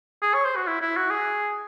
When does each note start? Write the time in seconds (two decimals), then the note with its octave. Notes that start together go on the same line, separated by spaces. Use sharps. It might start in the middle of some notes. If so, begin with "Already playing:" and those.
0.22 G#4
0.34 C#5
0.45 C5
0.56 F#4
0.67 E4
0.81 E4
0.96 F#4
1.10 G#4